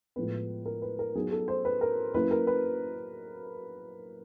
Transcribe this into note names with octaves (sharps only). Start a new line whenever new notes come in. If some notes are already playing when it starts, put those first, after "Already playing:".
A2 F3 G#3 B3 B4
A#4
B4
A#4
F#3 B3 D#4 G#4
A4
C5
B4
A#4
F#3 A#3 C#4 E4 B4
A#4
B4